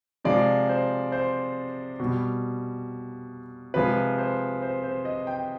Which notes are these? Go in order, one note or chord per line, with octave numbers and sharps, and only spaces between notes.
C3 F3 G#3 D5
C5
C5
B2 G3
C3 F3 G#3 B4
C5
C5
C5
D#5
G5